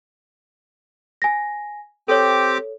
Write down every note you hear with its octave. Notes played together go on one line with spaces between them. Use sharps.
G#5 A#6
C4 G4 A4 C#5 D6